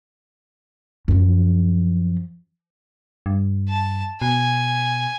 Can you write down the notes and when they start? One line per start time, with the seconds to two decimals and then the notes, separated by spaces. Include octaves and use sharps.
1.08 F#2 F3
3.26 G2
3.69 A5
4.22 B2 G#5